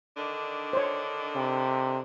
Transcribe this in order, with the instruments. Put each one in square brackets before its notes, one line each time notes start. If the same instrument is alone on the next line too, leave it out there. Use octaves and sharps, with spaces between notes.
[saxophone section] D3 D#3 D4
[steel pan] C5 C#5
[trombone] C3